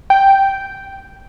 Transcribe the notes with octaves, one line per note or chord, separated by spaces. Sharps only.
G5